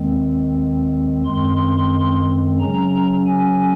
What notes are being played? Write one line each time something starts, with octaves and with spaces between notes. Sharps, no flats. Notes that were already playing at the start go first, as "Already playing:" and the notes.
Already playing: D#2 D#3 G#3 C4
F#2 D#3 G#3 C4 C6
C#3 F#3 C#4 A#5
G#5